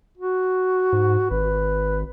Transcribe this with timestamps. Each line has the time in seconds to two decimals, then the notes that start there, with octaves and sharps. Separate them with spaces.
0.18 F#4
0.92 G#2
1.31 G#1 B4